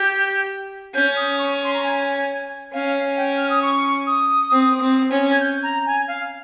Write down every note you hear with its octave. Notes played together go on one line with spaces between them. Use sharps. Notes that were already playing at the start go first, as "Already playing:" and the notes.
Already playing: G4 G6
C#4 G6
D#6
C#6
C6
A#5
G#5
C#4 F5
G5
F6
D#6
C#6
D#6
C4
C4
C#4
G#6
G6
A#5
G#5
F5